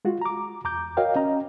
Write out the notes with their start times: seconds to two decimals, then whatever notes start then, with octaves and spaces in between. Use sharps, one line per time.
0.05 G#3 F4 F#4
0.21 A#5 D6
0.64 E2 A#5 D6 G6
0.97 F#4 A#4 C#5 D#5 F5 G5
1.16 C#4 D#5 A#5